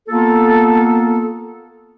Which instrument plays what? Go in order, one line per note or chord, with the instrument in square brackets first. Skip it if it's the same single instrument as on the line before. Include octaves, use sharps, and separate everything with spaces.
[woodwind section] A#3 B3 F4 A4